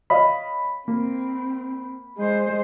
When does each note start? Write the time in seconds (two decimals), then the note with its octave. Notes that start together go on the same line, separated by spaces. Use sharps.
0.10 C#5 D#5 F5 B5
0.88 A#3 C4
2.18 G#3 C5